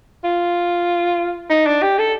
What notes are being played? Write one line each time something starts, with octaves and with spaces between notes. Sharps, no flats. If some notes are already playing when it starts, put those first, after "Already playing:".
F4
D#4
D4
G4
A4